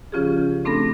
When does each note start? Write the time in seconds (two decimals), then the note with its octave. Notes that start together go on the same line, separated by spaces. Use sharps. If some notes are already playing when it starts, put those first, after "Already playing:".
0.12 C#3 F3 C#4 F4 G4 G#4
0.65 A3 C4 D4 A4 B5 A#6